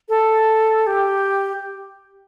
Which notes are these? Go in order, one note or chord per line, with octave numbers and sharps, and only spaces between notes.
A4
G4